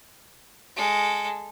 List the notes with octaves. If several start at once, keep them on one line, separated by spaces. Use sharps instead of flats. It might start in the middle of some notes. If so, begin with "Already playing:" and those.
G#3 A4